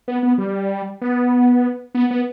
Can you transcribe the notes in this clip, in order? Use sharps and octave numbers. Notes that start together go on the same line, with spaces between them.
B3
B3
G3
B3
B3
B3